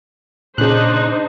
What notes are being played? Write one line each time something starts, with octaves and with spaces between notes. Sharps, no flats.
A#2 C#3 D4 D#4 C5 F#6